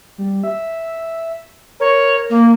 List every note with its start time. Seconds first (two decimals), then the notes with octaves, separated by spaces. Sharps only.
0.18 G3
0.44 E5
1.80 A#4 C#5
2.30 A#3